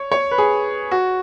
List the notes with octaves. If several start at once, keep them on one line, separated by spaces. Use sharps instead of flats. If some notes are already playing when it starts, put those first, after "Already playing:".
Already playing: C#5
C#5
B4
G#4
F#4